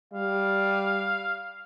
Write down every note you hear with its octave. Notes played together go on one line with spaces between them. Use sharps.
G3 F5